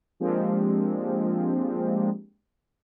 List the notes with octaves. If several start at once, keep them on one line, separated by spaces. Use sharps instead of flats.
F3 G#3 A#3 C4 D4 G4